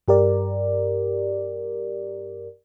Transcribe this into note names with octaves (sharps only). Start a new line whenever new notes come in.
G2 G4 A#4 D5